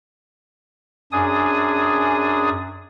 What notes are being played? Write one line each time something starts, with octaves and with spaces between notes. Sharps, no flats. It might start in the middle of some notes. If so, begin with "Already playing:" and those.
F#2 D4 G#4 G#5 D#6